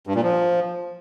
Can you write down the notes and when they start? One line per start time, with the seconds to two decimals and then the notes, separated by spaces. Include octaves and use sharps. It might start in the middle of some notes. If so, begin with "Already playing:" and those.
0.07 G2
0.15 A#2
0.23 F3